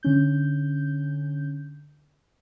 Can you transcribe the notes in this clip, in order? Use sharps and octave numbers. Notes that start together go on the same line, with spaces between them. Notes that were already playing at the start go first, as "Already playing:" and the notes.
D3 C#4 G6